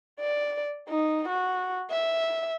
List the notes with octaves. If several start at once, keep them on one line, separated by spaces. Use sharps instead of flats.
D5
D#4
F#4
E5